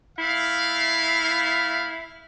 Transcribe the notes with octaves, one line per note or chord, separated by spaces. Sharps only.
A3 E4 F5